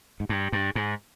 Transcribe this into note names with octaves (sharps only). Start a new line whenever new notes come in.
G#2
G2
G2
G#2